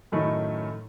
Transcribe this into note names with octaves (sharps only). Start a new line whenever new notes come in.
F#2 A2 D#3 A3 D#5 B5